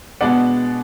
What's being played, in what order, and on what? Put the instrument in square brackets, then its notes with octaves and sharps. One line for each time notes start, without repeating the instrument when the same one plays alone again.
[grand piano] B2 G#3 B3 D4 D5 F#5